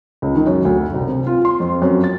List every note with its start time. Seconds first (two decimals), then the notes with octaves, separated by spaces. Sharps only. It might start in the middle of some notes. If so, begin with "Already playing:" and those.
0.22 C#2
0.35 D#3
0.47 F#2
0.65 D2
0.94 C2
1.07 C3
1.27 F4
1.45 C6
1.60 F2
1.82 F#2
2.04 A6